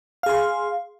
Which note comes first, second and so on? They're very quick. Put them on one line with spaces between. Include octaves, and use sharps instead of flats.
F5 G#4 C6